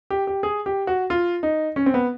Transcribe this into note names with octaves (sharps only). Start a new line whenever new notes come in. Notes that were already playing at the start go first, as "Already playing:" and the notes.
G4
G4
G#4
G4
F#4
F4
D#4
C#4
C4
B3